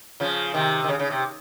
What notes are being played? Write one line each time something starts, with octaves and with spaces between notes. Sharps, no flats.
C#3 F3
C3 D#3
D#3
C#3
C#3
C3